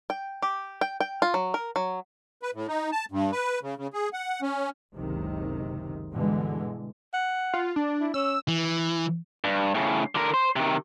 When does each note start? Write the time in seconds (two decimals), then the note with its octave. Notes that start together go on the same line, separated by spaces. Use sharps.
0.10 G5
0.42 G4
0.81 G5
1.00 G5
1.22 F4
1.34 F#3
1.54 A#4
1.76 F#3
2.42 B4
2.54 A2
2.68 D#4
2.92 A5
3.11 G2
3.32 B4
3.62 C#3
3.77 C#3
3.93 G#4
4.13 F#5
4.42 C#4
4.95 F#1 C#2 C3 D#3
6.12 G2 B2 D3 E3 G#3
7.14 F#5
7.54 F4
7.76 D4
8.00 E4
8.14 C#4 E6
8.48 E3
9.44 G2
9.75 A2 C#3
10.15 D3 A#4
10.34 C5
10.56 C3 D#3